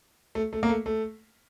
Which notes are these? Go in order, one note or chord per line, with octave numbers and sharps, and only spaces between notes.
A3
A3
A#3
A3
A3